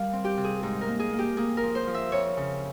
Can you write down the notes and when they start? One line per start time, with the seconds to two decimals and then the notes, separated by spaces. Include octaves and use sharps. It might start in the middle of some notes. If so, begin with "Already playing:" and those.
Already playing: G3 A#4 F5
0.13 C4
0.24 G4
0.37 C3
0.44 G#4
0.63 G#2 G#4
0.81 A#4
0.88 A#3
0.99 G#4
1.13 A#3
1.19 G4
1.37 A#3 G#4
1.57 A#4
1.63 F3
1.75 C5
1.87 F3
1.94 E5
2.12 F2 C#5
2.37 C#3